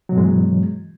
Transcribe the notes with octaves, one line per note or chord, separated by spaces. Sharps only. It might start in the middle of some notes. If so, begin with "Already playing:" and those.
G2 B2 E3 F#3 G#3